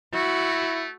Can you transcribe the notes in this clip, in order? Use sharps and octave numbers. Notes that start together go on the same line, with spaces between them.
A3 E4 F#4